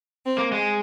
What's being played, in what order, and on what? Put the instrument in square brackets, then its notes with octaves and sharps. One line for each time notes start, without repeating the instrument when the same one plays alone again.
[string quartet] C4
[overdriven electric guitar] A#3
G#3